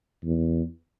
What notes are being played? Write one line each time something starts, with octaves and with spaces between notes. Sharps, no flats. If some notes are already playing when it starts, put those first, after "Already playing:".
E2